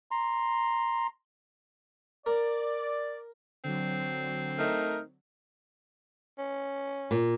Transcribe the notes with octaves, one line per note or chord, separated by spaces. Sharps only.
A#5 C6
A#4 D5
D3 F#3 C4
A3 D#4 A#4
C#4
A#2